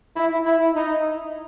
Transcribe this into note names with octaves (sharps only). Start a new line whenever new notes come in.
E4
E4
D#4